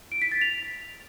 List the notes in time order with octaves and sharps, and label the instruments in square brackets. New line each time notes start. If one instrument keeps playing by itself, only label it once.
[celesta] D7
B6
A6
F7